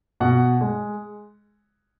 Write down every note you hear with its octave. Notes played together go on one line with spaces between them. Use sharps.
B2 F#5
G#3